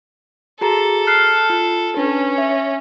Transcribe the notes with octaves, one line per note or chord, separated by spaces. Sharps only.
F#4 G#4 A4 A#5
F6 F#6 C7
F4
C#4 D4 B4
E5